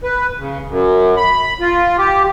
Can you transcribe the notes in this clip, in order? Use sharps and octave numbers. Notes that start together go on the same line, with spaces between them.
B4
C#3
F#2
B5
F4
G4